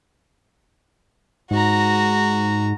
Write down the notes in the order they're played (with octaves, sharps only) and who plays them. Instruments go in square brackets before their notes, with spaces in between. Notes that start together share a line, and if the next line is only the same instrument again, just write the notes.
[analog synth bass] G#2 [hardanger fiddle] F#4 A#5